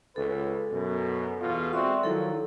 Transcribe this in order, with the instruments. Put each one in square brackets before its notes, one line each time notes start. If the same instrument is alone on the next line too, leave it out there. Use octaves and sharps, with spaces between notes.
[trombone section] C#2 B4 [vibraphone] A4
[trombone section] F#2 B2
E2 B2 F4
[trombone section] G#3 C4 F#4 [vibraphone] D5 E5 C6
[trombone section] D#3 F3 F#3 [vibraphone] E4 A4